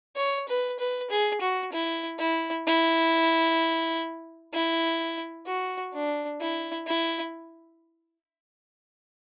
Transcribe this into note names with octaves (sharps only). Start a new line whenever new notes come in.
C#5
B4
B4
G#4
F#4
E4
E4
E4
E4
F#4
D4
E4
E4